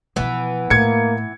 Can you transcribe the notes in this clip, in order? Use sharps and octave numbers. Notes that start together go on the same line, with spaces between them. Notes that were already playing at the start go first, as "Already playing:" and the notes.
B2 E3 F3 B3
A2 A#3 G#6 C#7